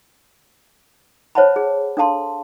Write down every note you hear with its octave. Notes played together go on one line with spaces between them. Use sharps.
C5 C#5 E5 F#5 A5 B5
G#4
D4 A4 F5 A5 C6